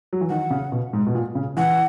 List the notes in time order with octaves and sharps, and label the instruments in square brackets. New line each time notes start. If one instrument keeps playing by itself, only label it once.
[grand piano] F#3
E3
[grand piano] D#3 [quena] F#5
[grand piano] C#3
B2
G#2
B2
A#2
C#3
[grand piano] E3 [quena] F#5